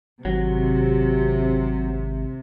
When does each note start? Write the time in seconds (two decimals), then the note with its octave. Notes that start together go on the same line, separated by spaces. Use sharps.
0.25 G#1 C3 F#3